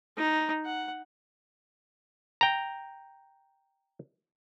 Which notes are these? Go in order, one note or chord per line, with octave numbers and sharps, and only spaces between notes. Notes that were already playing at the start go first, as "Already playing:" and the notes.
D#4
F#5
G5 A#5